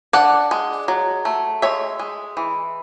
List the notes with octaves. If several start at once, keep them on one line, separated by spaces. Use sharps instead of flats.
D4 D5 F#5
G#3
F#3
A3
G#3 C#5 E5
G#3
E3